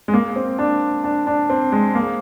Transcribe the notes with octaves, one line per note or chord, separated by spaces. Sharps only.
G#3
A#3
C4
D4
D4
D4
C4
G#3
A#3